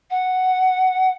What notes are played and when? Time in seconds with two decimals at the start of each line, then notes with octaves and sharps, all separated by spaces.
0.10 F#5